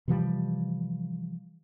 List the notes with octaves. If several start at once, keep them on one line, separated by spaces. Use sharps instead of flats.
C3 E3 F3 G3